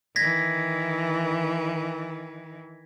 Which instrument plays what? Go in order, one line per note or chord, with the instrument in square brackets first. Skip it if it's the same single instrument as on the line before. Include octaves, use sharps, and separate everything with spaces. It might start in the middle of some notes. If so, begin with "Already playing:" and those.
[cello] D#3 E3 [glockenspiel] G#6 A#6 B6